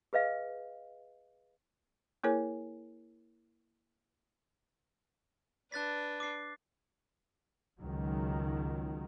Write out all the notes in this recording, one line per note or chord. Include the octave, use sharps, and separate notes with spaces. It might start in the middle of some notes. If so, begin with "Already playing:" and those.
G#4 B4 D#5 F5
A#3 E4 G#4 A#4 C#5 G#5
D4 B4 F#6 A6 B6
D6 C7
C#2 D#3 F#3